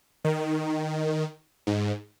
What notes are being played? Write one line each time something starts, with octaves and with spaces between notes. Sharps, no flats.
D#3
G#2